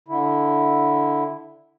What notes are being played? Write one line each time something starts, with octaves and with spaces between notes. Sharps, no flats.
D3 E4